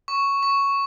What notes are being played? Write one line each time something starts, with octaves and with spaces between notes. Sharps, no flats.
C#6
C#6